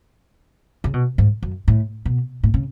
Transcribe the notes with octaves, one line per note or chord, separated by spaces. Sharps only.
C#3
B2
G#2
F#2
A2
B2
A2
C#3